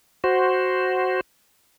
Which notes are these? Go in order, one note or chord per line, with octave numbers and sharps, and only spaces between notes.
F#4 C5